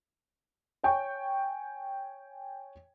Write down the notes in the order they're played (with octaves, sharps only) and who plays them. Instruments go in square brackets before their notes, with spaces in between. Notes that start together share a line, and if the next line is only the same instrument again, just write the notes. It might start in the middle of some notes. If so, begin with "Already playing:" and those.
[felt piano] C#5 G5 G#5 C#6